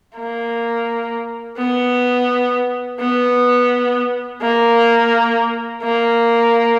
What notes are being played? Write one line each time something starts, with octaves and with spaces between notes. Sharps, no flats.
A#3
B3
B3
A#3
A#3